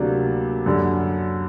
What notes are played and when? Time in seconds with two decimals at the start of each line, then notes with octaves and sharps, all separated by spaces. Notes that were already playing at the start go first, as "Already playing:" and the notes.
Already playing: D2 C3 F#3 A#3 D4
0.66 F#2 D3 G3